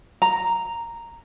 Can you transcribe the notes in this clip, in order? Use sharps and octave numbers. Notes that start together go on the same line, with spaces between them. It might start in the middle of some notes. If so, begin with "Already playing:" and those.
A#5